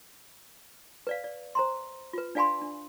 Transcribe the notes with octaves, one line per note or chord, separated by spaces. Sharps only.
B4 D5 F5
D5
C5 A#5 C6
F4 B4
D4 D5 F5 G#5 B5 C6
D4